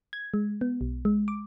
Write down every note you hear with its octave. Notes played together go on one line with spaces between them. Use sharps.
G#6
G#3
B3
B1
G#3
D6